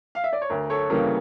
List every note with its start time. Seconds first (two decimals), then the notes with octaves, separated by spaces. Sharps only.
0.15 F5
0.24 E5
0.33 D5
0.41 C#5
0.50 D2 A#4
0.70 A4 C#5
0.90 C#3 E3 G3 A#3 A#4